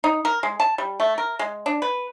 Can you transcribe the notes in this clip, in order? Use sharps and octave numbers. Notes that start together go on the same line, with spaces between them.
D#4
A#4
G#3
A5
G3
A3
A#4
G#3
D4
B4